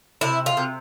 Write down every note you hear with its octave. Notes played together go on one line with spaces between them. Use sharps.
C3 E4
F4
C3